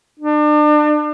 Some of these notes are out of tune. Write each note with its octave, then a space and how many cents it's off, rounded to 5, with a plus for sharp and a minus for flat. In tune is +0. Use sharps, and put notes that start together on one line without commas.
D4 +35